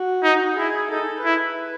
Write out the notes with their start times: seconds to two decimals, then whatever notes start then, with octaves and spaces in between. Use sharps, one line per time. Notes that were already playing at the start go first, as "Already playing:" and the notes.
Already playing: F#4
0.24 D#4
0.57 E4 G#4
0.91 D#4 A4
1.25 E4 B4